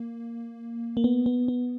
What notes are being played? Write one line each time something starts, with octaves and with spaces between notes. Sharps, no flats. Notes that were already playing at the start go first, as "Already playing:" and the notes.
Already playing: A#3
A#3
B3
B3
B3